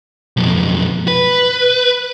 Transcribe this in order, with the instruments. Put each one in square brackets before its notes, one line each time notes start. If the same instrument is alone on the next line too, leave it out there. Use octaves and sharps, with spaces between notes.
[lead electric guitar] B1 F2
B4